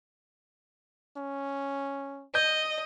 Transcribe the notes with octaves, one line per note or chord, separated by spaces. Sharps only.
C#4
D#5 G6